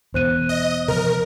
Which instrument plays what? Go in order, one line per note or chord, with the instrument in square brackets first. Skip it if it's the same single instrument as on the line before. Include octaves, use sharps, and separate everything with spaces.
[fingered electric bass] E2 B2 [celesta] C5 F#6 D#7
[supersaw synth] D#5
[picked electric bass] C3 F3 [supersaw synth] A#4